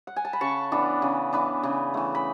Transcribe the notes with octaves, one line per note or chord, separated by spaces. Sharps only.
F#5
G#5
A5
B5
C#3 A5 C#6
E3 B3 D4
C#3
E3 B3 D4
C#3
E3 A3
B5